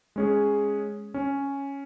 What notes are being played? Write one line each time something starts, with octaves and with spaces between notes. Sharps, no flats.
G#3 C#4 G#4
C#4